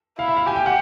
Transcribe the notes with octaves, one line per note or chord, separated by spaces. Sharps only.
E4 F5
E5
F5
G4 G#5
G5
F#5